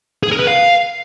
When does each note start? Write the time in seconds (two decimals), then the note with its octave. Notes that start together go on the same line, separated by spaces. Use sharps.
0.23 G#4
0.31 A#4
0.40 B4
0.48 F5